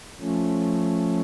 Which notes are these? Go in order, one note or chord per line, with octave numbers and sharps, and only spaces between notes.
F3 A3 C#4